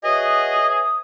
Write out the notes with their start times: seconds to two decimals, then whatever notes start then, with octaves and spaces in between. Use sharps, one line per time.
0.04 F#4 G#4 B4 C#5 D#5 E5
0.59 D#6